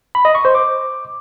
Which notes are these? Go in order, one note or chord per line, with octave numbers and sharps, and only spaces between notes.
B5
D#5
C#6
C5
D6